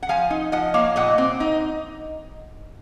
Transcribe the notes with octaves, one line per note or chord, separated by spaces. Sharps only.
F#5
F3 F5 G#5
D#4
F3 D#5 F#5
A#3 C#5 F5
A#2 D#5 F#5
C4
D#4